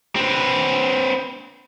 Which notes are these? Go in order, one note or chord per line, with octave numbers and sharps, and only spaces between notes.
C4 B4